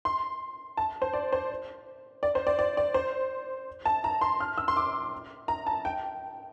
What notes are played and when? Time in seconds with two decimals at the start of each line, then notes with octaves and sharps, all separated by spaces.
0.05 C6
0.77 A5
1.02 C5
1.13 D5
1.32 C5
2.23 D5
2.35 C5
2.47 D5
2.59 D5
2.77 D5
2.94 C5
3.86 A5
4.04 A#5
4.21 C6
4.40 F6
4.58 E6
4.68 C6
4.77 D6
5.48 A#5
5.67 A5
5.85 G5